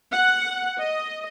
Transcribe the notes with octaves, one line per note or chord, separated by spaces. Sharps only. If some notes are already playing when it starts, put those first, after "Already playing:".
F#5
D#5